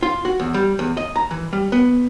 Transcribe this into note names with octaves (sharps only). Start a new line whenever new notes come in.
F4
F#4
E2
G3
E2
D#5
A#5
E3
G3
B3